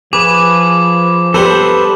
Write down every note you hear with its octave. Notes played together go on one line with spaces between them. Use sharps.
F3 G#4 B4 D6
G3 B3 C4 A4 B4 C5